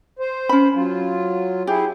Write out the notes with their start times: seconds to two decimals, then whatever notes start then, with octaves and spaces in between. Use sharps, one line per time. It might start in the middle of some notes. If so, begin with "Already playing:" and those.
0.19 C5
0.49 C#4 B5
0.74 F#3 F4
1.67 E4 G4 G#4